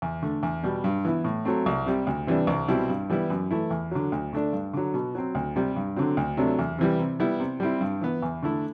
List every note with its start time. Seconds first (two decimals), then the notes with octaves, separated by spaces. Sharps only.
0.02 E2
0.22 D3 A3
0.43 E2
0.63 B2 G3
0.84 G2
1.05 E3 B3 E4
1.24 A2
1.45 F#3 A3 C4
1.66 C2
1.86 C3 G3
2.07 D2
2.27 C3 E3 G3 D4
2.47 C2
2.68 B2 G3 C4 E4
2.89 G2
3.10 E3 G3 B3 E4
3.30 F#2
3.51 E3 A3 E4
3.70 E2
3.91 D3 F#3
4.12 D2
4.33 D3 A3 D4
4.53 G2
4.73 D3 F#3
4.94 B2
5.15 F#3 C4
5.35 D2
5.56 C3 G3
5.76 G2
5.96 D3 F#3 C4
6.17 D2
6.37 C3 F#3 A3 D4
6.59 E2
6.78 C3 E3 G3
6.99 C3
7.20 G3 B3 E4
7.40 C3
7.60 G3 C4 E4
7.81 G2
8.01 E3 B3
8.22 E2
8.42 D3 A3 E4